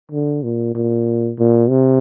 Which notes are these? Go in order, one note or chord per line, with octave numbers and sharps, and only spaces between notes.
D3
A#2
A#2
A#2
C3